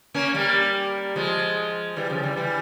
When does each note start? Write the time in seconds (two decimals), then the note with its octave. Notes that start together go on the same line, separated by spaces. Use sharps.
0.14 A#3 C#4
0.34 G3 A#3
1.16 F3 G#3
1.96 E3 G3
2.10 C#3 F3
2.23 E3 G3
2.36 E3 G3